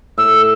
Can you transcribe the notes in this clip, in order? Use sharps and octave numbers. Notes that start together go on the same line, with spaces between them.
A2 E6